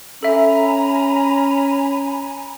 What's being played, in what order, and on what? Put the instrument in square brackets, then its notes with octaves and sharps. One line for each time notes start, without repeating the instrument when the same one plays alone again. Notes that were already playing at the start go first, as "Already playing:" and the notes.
[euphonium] C#4 [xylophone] A4 E5 [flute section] G#5 A#5 B5